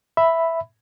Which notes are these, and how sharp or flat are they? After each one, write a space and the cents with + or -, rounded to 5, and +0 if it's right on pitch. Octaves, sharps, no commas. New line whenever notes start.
E5 +0 B5 +0